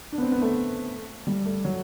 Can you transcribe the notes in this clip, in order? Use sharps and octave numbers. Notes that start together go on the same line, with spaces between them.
D4
B3
C4
B3
A3
G3
A3
F#3